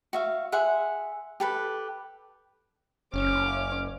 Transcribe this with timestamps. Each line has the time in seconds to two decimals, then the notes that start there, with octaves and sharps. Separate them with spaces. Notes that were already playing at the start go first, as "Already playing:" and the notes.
0.13 F#4 E5 F5
0.52 G#4 E5 F#5 C6
1.40 G4 A4 B4
3.14 F#1 C#4 D6 F6